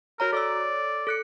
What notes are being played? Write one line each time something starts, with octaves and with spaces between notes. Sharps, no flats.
F#4 A#4 C#5 A#5
A4 C#5 D5 E6
A4 F#6 C#7